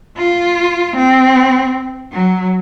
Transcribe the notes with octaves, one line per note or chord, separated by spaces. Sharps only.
F4
C4
F#3